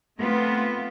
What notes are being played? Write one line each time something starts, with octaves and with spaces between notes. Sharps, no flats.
A3 B3 C4 F4